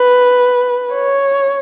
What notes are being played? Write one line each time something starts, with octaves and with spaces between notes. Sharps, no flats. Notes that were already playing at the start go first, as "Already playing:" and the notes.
Already playing: B4
C#5